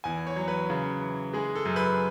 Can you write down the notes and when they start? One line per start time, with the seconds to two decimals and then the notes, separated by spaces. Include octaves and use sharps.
0.04 E2 G#5
0.27 C#5
0.36 F#3
0.48 B4
0.70 C#3
1.02 E3
1.34 G#3 G#4
1.55 A4
1.65 F#2
1.76 B4